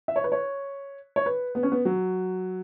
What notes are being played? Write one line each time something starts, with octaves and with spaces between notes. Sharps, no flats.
E5
C#5
B4
C#5
C#5
B4
B3
C#4
B3
F#3